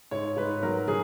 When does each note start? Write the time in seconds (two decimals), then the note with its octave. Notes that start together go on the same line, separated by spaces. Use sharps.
0.11 G#2 C#5
0.37 G#2 B4
0.63 F#3 A#4
0.88 F#3 G#4